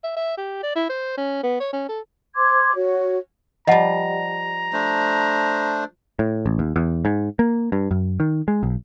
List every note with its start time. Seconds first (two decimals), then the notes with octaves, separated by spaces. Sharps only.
0.04 E5
0.17 E5
0.38 G4
0.63 D5
0.76 E4
0.90 C5
1.18 C#4
1.43 B3
1.60 C#5
1.73 C#4
1.89 A4
2.36 C5 C6 D6 G#6
2.75 F#4 C#5
3.67 F3 G3 D#5 F#5 A5 A#5
4.73 A3 D4 C5
6.19 A2
6.46 A1
6.59 D#2
6.76 E2
7.05 G#2
7.39 A#3
7.72 G2
7.91 F#2
8.20 D#3
8.48 G#3
8.63 B1